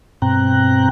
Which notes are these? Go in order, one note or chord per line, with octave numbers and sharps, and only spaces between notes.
G2 B2 C4 G5 A#5 F#6